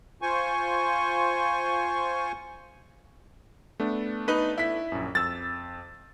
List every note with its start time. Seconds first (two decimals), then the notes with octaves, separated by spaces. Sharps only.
0.22 F4 C5 G#5 C#6
3.80 A3 B3 D4
4.28 D#4 B4
4.58 E4 B6
4.92 A#1 F#2
5.15 F2 E6 A6